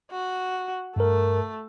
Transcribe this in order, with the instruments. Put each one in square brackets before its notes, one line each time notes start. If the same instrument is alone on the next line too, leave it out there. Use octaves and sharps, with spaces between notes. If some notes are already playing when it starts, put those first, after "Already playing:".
[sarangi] F#4
[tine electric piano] G2 A#4 [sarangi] A3